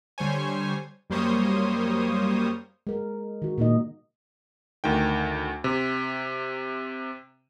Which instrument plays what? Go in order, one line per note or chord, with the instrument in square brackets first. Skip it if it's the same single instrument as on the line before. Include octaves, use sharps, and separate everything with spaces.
[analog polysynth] D3 G3 C5 C#5 G#5
F#2 G3 A#3 C5 C#5 D#6
[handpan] G#3 A#4
D#3 F#4
A#2 A#3 D#4 D#5
[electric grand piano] D2 D#3 G5
C3